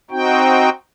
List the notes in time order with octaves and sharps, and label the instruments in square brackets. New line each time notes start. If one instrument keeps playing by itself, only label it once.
[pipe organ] C4 D#4 F#4 G5